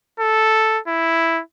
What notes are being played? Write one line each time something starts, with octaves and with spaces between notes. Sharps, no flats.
A4
E4